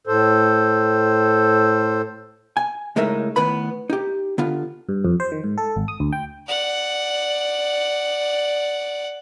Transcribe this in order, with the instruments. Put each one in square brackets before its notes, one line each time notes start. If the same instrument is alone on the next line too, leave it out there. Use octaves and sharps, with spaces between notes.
[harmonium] A2 A4 C5
[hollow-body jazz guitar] G#5
C#2 A2 G#3 D#4 A#4 E5
A2 D#3 B3 B4 B5
D#4 G4
D3 B3 F4
[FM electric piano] G2
F2
C5
D#3
G#2
A4
G#1
D#6
D2
G5
[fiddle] D5 F#5